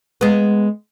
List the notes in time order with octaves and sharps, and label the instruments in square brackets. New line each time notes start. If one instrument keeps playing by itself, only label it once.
[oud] G#3 B3